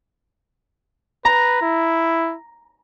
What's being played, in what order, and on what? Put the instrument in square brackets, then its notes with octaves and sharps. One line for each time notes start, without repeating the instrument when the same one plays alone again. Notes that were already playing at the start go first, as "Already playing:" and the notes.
[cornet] B4 [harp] A#5
[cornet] E4